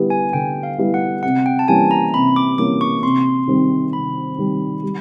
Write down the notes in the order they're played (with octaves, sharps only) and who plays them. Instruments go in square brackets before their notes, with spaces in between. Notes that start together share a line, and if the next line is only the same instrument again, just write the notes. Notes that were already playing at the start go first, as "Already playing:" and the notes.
Already playing: [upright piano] D3 G3 B3 E4 G4
[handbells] G#5
[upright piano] D3 [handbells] G5
[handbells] F5
[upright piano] G3 B3 E4 G4
[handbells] F#5
[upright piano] C3 [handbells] F#5
[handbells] G5
A5
[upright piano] E3 G3 A#3 C#4 [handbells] G#5
[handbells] A#5
[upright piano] C3 [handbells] B5
[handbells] D6
[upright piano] E3 G3 A#3 C#4 [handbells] D6
[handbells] C#6
[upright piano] C3 [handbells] C6
[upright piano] D#3 G3 C4
[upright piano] C3 [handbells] B5
[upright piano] D#3 G3 C4
G3